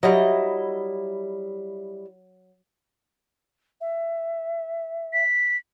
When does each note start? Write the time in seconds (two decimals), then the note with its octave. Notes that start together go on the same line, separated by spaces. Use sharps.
0.03 F#3 G3 E4 D#5
3.80 E5
5.13 B6